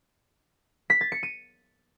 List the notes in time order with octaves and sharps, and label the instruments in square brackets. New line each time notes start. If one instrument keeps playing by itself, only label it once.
[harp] B6
A6
C#7
D#7